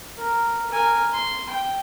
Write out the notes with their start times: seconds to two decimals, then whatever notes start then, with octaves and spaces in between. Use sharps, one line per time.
0.18 A#4
0.70 A#4 G#5
1.13 C6
1.50 G5